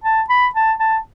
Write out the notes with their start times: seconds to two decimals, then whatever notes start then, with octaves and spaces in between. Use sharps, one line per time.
0.04 A5
0.29 B5
0.55 A5
0.80 A5